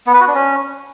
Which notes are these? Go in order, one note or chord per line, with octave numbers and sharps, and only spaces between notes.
B3
B4
F#4
D4
C#4